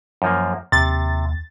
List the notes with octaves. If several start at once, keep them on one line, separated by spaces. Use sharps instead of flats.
F#2 F3 A#3
D#2 C3 A6